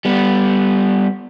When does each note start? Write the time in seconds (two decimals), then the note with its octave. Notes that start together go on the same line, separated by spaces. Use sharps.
0.05 G3 B3